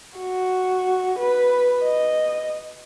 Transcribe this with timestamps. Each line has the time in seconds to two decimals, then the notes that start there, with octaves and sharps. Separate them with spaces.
0.19 F#4
1.19 B4
1.84 D#5